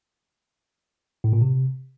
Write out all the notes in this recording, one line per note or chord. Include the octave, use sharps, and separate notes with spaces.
A2
A#2
C3